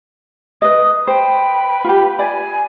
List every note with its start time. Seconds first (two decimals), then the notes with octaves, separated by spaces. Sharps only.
0.62 B4 D#5 D#6
1.07 B4 C5 G5
1.84 F4 G4
2.19 D5 G#5